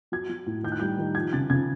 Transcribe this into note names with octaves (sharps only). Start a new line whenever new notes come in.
F#3 G#6
F#3
A2
D#3 G6
F#6
G3 G6
D#3
F3 G#6
C#3 A6
C#3 G#6